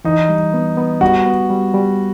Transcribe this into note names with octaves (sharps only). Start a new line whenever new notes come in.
E3 D#4
G3
B3
B3
G3 F#4
B3
G3
G3